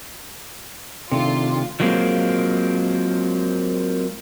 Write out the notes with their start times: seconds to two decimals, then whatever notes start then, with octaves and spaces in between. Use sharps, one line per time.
1.12 C3 D#3 A3 D4 F4
1.80 F3 F#3 G#3 A#3 C4